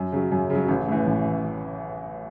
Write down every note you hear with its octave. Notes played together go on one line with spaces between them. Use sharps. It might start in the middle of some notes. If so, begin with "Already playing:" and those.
Already playing: F#2
C#3 F#3
F#2
C#3
F#3
A1
A2 E3
A1